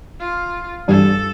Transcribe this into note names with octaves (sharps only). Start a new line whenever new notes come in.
F4
G2 E3 G3 D4 A4